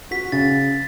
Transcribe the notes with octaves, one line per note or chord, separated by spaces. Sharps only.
F#4 B6
C#3 A6